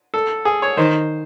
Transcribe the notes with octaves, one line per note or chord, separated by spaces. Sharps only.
A4
G#4
C#5
D#3 C5